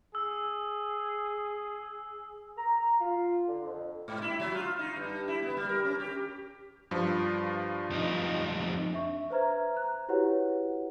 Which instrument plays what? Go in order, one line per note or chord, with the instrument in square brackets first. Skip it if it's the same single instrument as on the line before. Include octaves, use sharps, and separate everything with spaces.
[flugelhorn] G#4 [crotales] E6
[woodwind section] A#5
F4
D3
F2
[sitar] G#2
E4
F#3
F4
D#4
G2
E4
B3
G3
A#4
C#4
G4
[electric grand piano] G2 F3
[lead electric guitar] F2 D#4
[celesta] D4 E5 C#6
B4 C5 E5 A#5 F6 G#6
A#5 F#6
E4 F#4 G4 B4 C#5 F#5